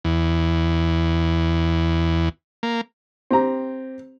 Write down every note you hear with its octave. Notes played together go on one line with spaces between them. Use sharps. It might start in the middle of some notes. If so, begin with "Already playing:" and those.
E2
A#3
C4 G4 A#5